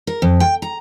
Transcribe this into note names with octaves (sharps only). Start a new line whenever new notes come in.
A#4
F2
G5
A#5